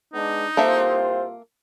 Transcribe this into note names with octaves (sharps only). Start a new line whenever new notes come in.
G#3 B3 D4 D#4
C2 C3 A#3 F4 A4 C5 E5